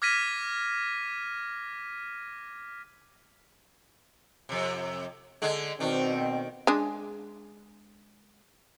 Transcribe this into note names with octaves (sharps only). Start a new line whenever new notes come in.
D6 F6 G#6 A#6 B6 D#7
F2 C3
D3 G#3
B2 D#3 C4 D4
G#3 D4 G#4